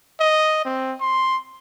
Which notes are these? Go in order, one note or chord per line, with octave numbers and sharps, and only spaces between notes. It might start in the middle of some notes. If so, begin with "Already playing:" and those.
D#5
C4
C6